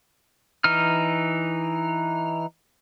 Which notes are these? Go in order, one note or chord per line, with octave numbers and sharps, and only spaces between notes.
E3 D#4 F6